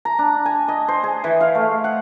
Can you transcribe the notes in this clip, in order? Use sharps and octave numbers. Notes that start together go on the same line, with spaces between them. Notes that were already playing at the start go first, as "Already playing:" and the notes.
A#5
D4
G#5
D#5
C5
G#4
E3
F5
A3
F#5